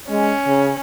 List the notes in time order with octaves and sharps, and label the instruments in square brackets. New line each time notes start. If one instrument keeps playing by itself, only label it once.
[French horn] G#3 [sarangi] C#4
[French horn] C#3